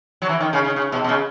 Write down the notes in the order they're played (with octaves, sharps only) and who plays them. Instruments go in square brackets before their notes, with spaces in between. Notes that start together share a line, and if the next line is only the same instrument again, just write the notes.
[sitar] F#3
E3
D#3
C#3
C#3
C#3
B2
B2
C#3